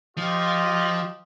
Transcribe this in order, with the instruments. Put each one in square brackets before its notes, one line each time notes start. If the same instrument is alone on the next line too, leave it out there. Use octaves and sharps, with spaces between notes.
[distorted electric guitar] F3 [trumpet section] F4 G4 D#5